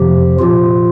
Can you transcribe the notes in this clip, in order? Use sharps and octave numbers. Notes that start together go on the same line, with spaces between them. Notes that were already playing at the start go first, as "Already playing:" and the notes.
Already playing: F2 C3 F3 G4
A#2 F3 F4